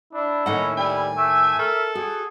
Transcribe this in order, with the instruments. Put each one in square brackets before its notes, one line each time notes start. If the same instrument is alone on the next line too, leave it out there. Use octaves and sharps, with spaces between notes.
[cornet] D4 [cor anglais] E4
[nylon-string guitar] D#2 A2 F#5 [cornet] C#4 [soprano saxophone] D#4
[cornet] G3 [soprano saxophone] G#5
[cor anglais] A3 [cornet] E5
[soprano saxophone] A4 [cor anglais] A#4
[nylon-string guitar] F#4 [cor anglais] G#4